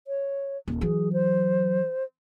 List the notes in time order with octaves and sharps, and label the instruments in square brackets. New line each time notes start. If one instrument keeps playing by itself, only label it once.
[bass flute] C#5
[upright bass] D#1
[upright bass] E3 F#3 [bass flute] G#4
[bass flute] C5